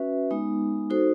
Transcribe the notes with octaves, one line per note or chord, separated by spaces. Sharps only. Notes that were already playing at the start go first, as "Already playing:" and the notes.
Already playing: C#4 F#4 B4 E5
G#3 B3 D#4
D#4 F#4 A4 C5